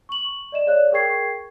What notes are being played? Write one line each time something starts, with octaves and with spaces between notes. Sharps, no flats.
C#6 F#7
D5 D#5 E7
G#4 C#5 D5 F5 F#6
G#4 A#4 G5 C#6 G#6 C7